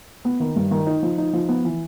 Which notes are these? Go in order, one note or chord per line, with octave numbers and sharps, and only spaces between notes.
B3
D#3
G2
D#3
D#4
F3
D#4
F3
B3
E3